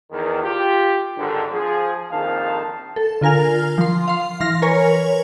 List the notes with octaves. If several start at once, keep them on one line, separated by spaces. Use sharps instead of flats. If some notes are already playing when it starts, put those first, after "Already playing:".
E2 D#3
F4 G4
G#1 D3
F3 G#4
A#1 F2 D#3 F5 A5
A4
D3 F4 A#4 G#5 F6
F3 C6
F5 C6
E3 C6 F6 A#6
A#4 B4 C#5 G#5